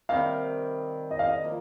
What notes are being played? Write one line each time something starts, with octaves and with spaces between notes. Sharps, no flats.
C3 D#3 G3 F5
D#5
F5
D#5
F3 A#3